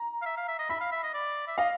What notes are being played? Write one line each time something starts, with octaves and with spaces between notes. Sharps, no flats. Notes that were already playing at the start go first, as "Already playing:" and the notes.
Already playing: A#5
F5
E5
F5
E5
D#5
E5 B5
F5
E5
D#5
D5
E5
D#5 F5